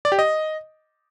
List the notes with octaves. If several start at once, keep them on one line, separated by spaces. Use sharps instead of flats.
D5
G4
D#5